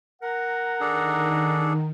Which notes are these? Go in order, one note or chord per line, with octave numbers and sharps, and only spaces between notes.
A#4 F#5 A#5
D#3 D4 G#4 A4